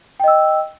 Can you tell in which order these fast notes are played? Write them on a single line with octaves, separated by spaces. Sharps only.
G5 D#5 E6